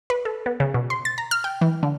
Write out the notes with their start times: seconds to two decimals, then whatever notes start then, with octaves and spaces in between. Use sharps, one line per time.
0.10 B4
0.25 A4
0.46 B3
0.60 C#3
0.74 B2
0.90 C6
1.05 A6
1.18 A#5
1.31 F6
1.44 G5
1.61 E3
1.83 D3